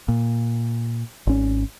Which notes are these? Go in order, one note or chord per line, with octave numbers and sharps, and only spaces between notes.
A#2
G#1 C#4